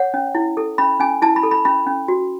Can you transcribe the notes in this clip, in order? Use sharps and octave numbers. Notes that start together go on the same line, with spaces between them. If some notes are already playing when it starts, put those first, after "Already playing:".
Already playing: C#5 F#5
C#4
E4
A4
C#4 B5
C#4 G#5
E4 A5
B5
A4
B5
C#4 B5
C#4
F#4